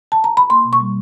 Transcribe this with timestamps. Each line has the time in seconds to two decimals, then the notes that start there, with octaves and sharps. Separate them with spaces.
0.12 A5
0.24 A#5
0.37 B5
0.50 A#3 C6
0.65 B2
0.73 C#6
0.80 G3